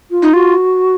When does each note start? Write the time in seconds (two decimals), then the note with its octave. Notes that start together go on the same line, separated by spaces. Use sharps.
0.11 F4
0.22 D#4
0.33 F4 F#4